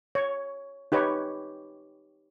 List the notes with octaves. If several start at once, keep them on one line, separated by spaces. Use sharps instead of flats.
C#5
D#4 G4 B4 C#5